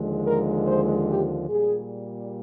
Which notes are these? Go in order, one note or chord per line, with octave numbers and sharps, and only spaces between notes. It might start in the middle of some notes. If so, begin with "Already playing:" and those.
Already playing: D#2 D3 F3 G#3
A#4
C5
G4
A#2 G3 G#4